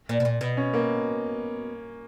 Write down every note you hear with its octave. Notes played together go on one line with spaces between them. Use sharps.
A#2
B2
A#2
B2
C#4
A#3